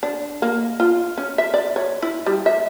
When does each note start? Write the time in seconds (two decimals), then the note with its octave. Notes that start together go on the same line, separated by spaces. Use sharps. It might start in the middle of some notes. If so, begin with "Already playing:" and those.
0.03 D4
0.42 A#3
0.80 F4
1.18 C#4
1.38 E5
1.54 D5
1.76 C#5
2.02 E4
2.26 G3
2.46 E5